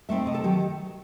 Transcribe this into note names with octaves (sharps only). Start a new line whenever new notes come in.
A3 C4 D#4 E5
C3 D#5
A4
D#3 F#3 G4